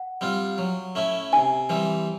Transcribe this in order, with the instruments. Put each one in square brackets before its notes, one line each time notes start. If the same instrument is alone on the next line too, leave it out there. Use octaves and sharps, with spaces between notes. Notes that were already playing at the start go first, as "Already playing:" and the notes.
Already playing: [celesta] F#5
[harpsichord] G3 C4 F4
F#3
A3 C#4 E4
[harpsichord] C3 [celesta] G#5
[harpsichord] E3 G3 C4